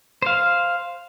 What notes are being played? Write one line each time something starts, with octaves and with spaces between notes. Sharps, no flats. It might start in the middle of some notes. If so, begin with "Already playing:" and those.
C5 F5